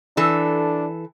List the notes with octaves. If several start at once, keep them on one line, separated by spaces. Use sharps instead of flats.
E3 D4 A4